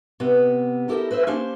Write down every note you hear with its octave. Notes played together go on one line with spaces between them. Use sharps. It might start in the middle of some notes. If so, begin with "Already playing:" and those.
C3 B3
E4 G4 A4 A#4 D5 D#5
B4 C5 D#5 E5
A#3 C#4 D4 G4 C5